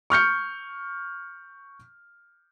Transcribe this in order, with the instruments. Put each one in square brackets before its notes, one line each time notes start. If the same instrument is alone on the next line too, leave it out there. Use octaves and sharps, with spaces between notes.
[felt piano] C#6 F6 G6 C#7